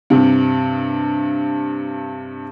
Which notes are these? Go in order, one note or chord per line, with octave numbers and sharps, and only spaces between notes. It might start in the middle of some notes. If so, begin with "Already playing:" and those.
G2 C3